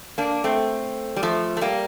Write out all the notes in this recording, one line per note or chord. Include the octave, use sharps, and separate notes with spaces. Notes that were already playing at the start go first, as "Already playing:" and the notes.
A#3 D4
A3 C4
G3
F3 A3
A3
G3 A#3